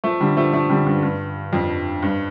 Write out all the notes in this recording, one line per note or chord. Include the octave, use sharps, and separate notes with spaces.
F3 A3
D3 G3
F3 A3
F3 A3
D3 G3
G2
G2
F2
G2